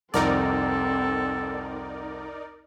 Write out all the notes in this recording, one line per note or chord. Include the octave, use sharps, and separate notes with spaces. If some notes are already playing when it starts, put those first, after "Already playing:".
C2 F2 C4 D#4 A4 A#4 D5